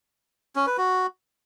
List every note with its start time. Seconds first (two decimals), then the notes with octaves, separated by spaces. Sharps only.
0.56 C#4
0.67 B4
0.78 F#4